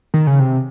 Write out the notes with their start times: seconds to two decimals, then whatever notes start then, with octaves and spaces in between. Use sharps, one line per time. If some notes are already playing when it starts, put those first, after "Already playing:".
0.14 D#3
0.27 C#3
0.40 C3